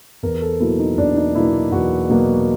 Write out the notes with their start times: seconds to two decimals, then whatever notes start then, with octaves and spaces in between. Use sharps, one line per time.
0.23 E2 A#4
0.42 A4
0.60 B2 F#3 A#3 E4
0.79 D#4
0.98 E2 D4
1.17 D#4
1.35 B2 F#3 A#3 E4
1.72 E2 F#4
2.10 B2 F#3 A#3